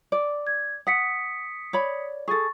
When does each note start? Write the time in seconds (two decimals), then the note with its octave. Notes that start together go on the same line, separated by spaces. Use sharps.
0.12 D5
0.47 G#6
0.87 F#5 D#6 B6 C#7
1.73 C#5 D5 B5
2.28 G#4 A4 C#6 A6